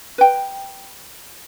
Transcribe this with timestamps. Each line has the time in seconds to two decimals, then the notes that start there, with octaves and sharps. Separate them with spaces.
0.18 B4 G5